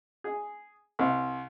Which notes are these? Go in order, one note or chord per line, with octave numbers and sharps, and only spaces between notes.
G#4
C2